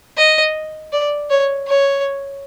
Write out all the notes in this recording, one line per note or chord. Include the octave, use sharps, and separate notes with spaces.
D#5
D5
C#5
C#5